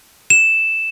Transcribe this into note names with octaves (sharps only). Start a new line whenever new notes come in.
E7